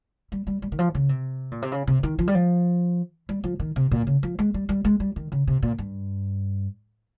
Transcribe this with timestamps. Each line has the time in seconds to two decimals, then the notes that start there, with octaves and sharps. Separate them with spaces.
0.32 G3
0.47 G3
0.62 G3
0.72 D#3
0.79 F3
0.95 C#3
1.09 C3
1.52 A#2
1.62 C3
1.72 C#3
1.87 C3
2.03 D#3
2.19 F3
2.28 G3
2.35 F3
3.29 G3
3.44 F3
3.60 D#3
3.76 C3
3.91 A#2
4.07 C#3
4.23 F3
4.39 G#3
4.54 G3
4.69 G3
4.85 G#3
5.00 G3
5.16 D#3
5.32 C#3
5.47 C3
5.63 A#2
5.78 G2